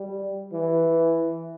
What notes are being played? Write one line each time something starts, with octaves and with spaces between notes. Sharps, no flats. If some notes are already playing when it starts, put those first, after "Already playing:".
Already playing: G3
E3